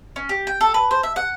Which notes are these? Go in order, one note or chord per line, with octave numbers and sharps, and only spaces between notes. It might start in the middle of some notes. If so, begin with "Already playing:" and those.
C#4
G4
G5
A4
B4
C5
E5
F#5